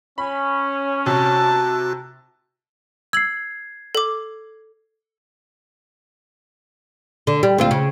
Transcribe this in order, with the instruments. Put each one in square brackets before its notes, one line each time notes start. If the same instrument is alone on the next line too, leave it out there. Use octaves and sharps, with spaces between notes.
[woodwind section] C#4 [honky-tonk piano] B5
[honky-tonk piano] C3 [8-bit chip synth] F#4 F#6 [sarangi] A5
[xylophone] E6 F#7 [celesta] G#6 C7
[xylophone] A4 D6
[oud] D3
G3
D2 C4 F4
C#3